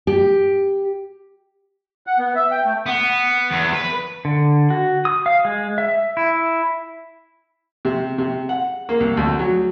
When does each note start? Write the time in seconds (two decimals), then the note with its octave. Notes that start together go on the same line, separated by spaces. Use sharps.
0.07 G4
2.07 F#5
2.19 B3
2.36 E5
2.51 G5
2.65 A3
2.86 B3
3.50 E2
3.73 B4
4.25 D3
4.70 F#4
5.05 D#6
5.26 F5
5.45 G#3
5.78 E5
6.17 E4
7.85 C3
8.18 C3
8.49 F#5
8.89 A#3
9.00 C2
9.17 D2
9.39 F#3